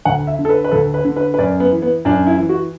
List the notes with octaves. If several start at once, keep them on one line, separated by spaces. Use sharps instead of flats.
D2 F#5
E5
D3
A4
B4
B4
D2 A4
B4
D3
B4
B4
F#2 D5
B3
E3
B3
F#2 D4
E4
E3
F#4